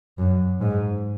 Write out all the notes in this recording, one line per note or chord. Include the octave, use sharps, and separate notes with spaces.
F#2
G#2